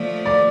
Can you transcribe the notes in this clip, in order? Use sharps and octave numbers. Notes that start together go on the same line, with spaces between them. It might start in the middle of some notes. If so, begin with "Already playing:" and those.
Already playing: F3 A3 D5
D5